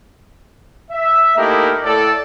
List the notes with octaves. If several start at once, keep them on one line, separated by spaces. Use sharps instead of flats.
E5
A3 A#3 D#4 E4 G4 A#4
A2 A4 D5